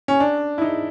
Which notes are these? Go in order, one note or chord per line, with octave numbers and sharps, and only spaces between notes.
C#4
D4
E4
D#4